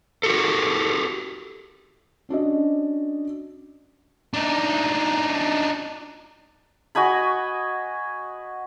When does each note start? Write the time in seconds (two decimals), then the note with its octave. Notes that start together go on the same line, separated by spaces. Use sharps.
0.23 F#4 G4 A4
2.29 C#4 D4 F#4 D#5
4.34 D4 D#4
6.95 F#4 D#5 G#5 B5